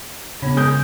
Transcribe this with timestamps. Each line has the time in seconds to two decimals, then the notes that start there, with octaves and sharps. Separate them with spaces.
0.42 C#3 B3 D4 C#5 B5
0.57 G#3 D#6 G6